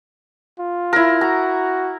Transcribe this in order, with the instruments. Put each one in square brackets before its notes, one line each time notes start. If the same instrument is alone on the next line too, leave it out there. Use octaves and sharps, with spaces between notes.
[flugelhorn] F4
[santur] E4 A#4
[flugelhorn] F#4 [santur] A#5